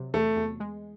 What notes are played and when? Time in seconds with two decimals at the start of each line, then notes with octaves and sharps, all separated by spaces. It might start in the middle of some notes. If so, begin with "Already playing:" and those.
Already playing: C3 F#3
0.14 E2 A3
0.36 E2
0.60 G#3